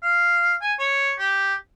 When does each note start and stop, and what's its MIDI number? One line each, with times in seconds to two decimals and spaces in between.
0.03 0.54 77
0.62 0.73 80
0.79 1.13 73
1.18 1.54 67